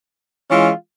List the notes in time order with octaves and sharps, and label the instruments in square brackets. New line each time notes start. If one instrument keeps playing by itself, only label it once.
[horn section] E3 G#3 C#4 F4